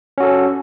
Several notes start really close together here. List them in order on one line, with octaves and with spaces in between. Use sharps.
C#4 F#4 A4